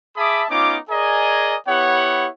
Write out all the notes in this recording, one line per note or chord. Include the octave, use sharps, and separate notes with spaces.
G#4 E5 A5 B5 D6 D#6
B3 C#4 D#4 F4 D6
G#4 A#4 D5 D#5 G#5 A#5
B3 E4 G4 C#5 F#5